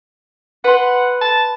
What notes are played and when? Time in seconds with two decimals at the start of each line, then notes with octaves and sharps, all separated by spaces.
0.64 B4 F#5 C6
1.21 A5